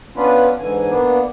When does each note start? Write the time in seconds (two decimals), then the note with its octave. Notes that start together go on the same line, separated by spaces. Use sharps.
0.16 B3 C#4 D4 F4 B4
0.59 G#2 D3 E3 G#5
0.90 A#3 B3 D4